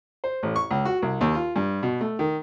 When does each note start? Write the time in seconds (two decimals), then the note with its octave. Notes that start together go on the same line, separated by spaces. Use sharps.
0.24 C5
0.43 A1
0.56 C#6
0.71 C#2
0.85 F#4
1.02 C2
1.21 D#2
1.35 F4
1.56 G2
1.83 B2
2.01 A3
2.19 D#3